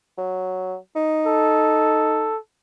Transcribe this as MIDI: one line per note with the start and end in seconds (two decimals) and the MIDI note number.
0.18 0.76 54
0.96 2.30 63
1.26 2.37 69